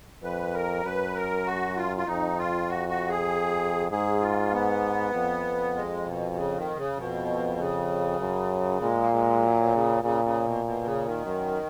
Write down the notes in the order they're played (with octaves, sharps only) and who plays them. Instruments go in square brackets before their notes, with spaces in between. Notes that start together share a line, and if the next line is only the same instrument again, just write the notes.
[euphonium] F2 [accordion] B4
[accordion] A#4
[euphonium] F#2 [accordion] B4
[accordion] A#4
F#4
F4
F4
[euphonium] F2 [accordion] D#4
[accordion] F4
F#4
F#4
G#4
[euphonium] G#2 [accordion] G#4
[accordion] F4
B3
[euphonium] F2
[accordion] G#3
B2
C#3
D#3
C#3
[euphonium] F2 [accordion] B2
[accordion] C#3
[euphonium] F#2
[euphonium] A#2 [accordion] G#3
[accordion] A#3
G#3
F#3
B2
C#3
[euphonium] A#2 [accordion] C#3
[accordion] C#3
B2
B2
C#3
D#3
[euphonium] F#2